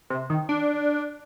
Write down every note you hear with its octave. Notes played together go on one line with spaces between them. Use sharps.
C3
D#3
D4